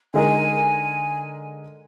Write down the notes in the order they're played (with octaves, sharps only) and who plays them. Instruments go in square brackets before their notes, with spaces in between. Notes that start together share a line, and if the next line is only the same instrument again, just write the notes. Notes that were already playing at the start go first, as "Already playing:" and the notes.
[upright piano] D3 G#3 D#4 A#4 [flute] G#5